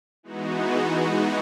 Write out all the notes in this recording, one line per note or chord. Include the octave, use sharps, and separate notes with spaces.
E3 G#3 B3 D#4 F#4